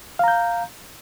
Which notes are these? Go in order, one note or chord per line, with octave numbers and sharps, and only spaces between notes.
F5 A#5 G6